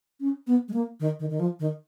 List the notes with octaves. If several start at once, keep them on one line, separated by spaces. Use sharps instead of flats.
C#4
B3
G#3
A#3
D#3
D#3
D#3
F3
D#3